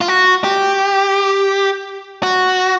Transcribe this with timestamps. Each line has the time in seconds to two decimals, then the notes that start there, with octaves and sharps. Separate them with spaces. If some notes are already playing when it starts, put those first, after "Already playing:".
0.01 F4
0.08 F#4
0.44 G4
2.23 F#4